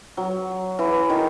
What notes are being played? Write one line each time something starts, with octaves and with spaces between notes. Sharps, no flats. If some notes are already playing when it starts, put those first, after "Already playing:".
F#3
E3
D#3